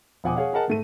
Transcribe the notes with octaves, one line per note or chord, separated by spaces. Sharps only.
E1 F3 F#5 G#5 D6 D#6
G#4 C#5 F5 F#5
G#4 A#4 D#5 F#5 A5
G#2 A3 D#7